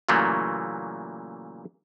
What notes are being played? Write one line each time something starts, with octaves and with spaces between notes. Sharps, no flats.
A#2 C#3 E3 F#3 A3 A#3